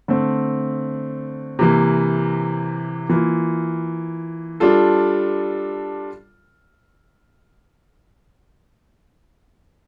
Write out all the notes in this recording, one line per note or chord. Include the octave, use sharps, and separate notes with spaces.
D3 A3 C4
C3 E3 A#3
E3 A#3 F4
G3 D4 F4 A4